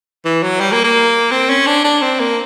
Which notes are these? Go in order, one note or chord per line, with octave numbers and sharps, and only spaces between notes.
E3
F#3
G3
A#3
A#3
C4
C#4
D4
D4
C4
A#3